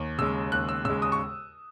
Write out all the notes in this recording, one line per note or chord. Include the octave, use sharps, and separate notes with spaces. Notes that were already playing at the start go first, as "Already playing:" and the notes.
Already playing: D#2
C#3 G#3 E6
D#2 F#6
E6
C#3 G#3 E6
D#6
C#6